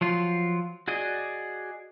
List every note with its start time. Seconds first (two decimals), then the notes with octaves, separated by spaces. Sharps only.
0.01 F3 F#3 F4
0.88 F#4 G#4 D5 D#5